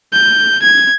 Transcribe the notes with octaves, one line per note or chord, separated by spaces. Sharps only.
G6
G#6